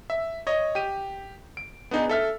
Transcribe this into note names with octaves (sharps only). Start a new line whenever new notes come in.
E5
C#5 D#5
G4 D#7
D7
B3 D4 D#4 G#4
A4 E5 F6